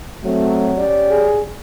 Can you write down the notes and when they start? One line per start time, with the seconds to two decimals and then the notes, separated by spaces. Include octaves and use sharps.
0.25 F#3 A3 C4
0.78 C#4 G4 D5
1.09 G#4